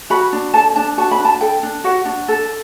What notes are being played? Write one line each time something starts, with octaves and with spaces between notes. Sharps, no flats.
F#4 B5
D4
A4 A5
D4 A5
F#4 A5
B5
D4
A5
A4 G5
D4
F#4 F#5
D4
A4